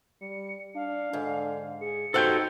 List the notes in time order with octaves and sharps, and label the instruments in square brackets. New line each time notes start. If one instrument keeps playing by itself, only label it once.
[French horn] G3 [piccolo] C#7
[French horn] D4 [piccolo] F5
[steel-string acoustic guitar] G#2 [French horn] D3
[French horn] G#4 [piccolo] C#7
[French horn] D#4 [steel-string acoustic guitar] F#4 G4 C5 [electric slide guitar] A4 F#5 G5